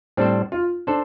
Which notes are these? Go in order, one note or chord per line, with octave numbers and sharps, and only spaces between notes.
A2 G3 C4 D4 A4 C5
F4
D4 A4 C5